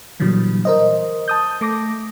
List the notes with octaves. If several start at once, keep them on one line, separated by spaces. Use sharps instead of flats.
A#2 D3 E3 F#3 G3
A#4 C5 D#5
A5 D#6 G6
A3 D6 A#6